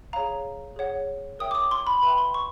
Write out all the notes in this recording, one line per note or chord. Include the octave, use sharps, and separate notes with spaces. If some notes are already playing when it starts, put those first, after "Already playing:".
G#4 C#5 F5 A#5
G#4 C#5 F#5
A#4 C#5 E5 G5 D#6
D6
D#6
C6
B5
B4 E5 G5 B5
C6
C#6